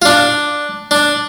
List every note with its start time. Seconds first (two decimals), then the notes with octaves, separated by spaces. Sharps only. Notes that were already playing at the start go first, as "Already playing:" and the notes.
0.02 F4
0.05 D4
0.91 D4